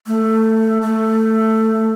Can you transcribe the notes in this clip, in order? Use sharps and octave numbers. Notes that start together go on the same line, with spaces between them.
A3
A3